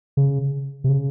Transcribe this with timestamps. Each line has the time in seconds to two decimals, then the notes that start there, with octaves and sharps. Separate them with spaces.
0.17 C#3
0.84 C3
0.89 C#3